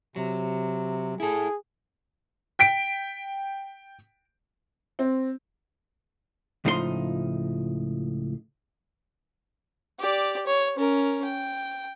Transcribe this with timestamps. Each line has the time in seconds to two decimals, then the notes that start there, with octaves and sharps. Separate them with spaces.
0.16 C3 F#3
1.20 E4 G#4 A4
2.59 G5 B6 D7
4.99 C4
6.65 C#2 A2 F3 D#4 A4 C6
10.00 G4 D5
10.47 C#5
10.77 C#4 A#4
11.25 G5